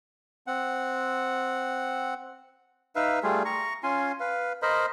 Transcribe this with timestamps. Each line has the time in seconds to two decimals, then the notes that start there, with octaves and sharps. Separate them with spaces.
0.47 C4 F#5
2.96 D#4 B4 E5 F5
3.23 G3 A3 F4 G#4
3.45 A#5 C#6
3.83 C#4 F4 G#5 C6
4.20 B4 F5
4.62 A#4 C5 D#5 B5